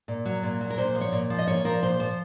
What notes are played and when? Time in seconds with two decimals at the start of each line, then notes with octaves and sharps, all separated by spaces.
0.08 A#2
0.25 F#3
0.43 A#2
0.61 F#3
0.70 A#4
0.78 A#2 C5
0.95 F3
1.01 C#5
1.12 A#2
1.30 F3
1.38 D#5
1.47 A#2 C#5
1.65 F3 A#4
1.82 A#2 C5
2.00 F3 C5